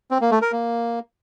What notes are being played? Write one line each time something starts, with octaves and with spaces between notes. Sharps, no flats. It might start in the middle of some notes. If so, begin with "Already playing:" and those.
C4
A#3
A3
A#4
A#3